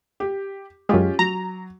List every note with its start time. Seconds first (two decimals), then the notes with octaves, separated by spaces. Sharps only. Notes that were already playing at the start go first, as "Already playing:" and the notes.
0.20 G4
0.89 F#2 G#3 C#4 F4 G4
1.19 F#3 A#5